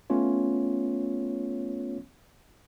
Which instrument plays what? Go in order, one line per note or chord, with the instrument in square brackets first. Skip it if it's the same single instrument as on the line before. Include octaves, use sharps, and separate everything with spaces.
[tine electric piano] A3 B3 C#4 F4 C#5